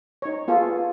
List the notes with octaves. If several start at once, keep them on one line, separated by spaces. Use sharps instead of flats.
D#4 C#5
B3 F4 G#4 A4